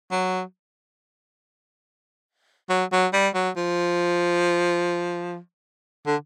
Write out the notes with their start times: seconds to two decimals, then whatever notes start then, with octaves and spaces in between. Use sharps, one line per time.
0.11 F#3
2.70 F#3
2.92 F#3
3.13 G3
3.34 F#3
3.57 F3
6.06 D3